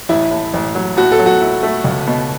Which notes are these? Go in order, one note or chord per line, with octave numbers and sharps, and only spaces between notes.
A1 E4
A2
A1
F#3
A2 F#4
A4
F#3
F#4
E4
A3
C#2
B2